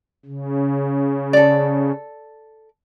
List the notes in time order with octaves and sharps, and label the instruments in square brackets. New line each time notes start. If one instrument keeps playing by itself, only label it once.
[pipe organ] C#3
[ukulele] A4 D5